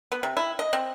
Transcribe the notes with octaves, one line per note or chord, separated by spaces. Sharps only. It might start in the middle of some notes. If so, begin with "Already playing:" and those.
B3
C3
E4
D#5
C4